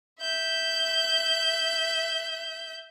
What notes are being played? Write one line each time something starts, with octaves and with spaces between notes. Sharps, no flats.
E5 G6